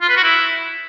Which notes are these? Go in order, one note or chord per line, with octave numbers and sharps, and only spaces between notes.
F4
B4
F#4
E4